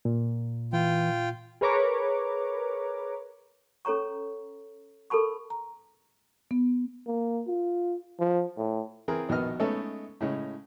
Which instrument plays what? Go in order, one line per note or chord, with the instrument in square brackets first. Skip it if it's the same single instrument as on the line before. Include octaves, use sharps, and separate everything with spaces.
[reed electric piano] A#2
[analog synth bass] E3 [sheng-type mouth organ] F4 G5
[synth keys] G#4 A#4 B4 C#5 A#5 D6
[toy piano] C#4 A4 C#5 A#5 C#6
A4 A#4 A5 B5 C#6
[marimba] A#5
B3
[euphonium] A#3
F4
F3
A2
[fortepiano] E3 C4 G#4 A#4
A#1 B2 D#3 B3 D#5 F6
G#3 A3 B3 C#4 D#4 A4
A2 C#3 G#3